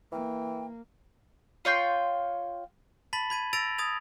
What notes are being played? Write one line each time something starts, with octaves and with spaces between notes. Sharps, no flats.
E3 A#3 G5
F4 C#5 G5 C6
A5 B5 A6 B6 F#7
B5 G#6 D#7
E6 A6 A#6 D7 F7
D#6 G#6 A6 F7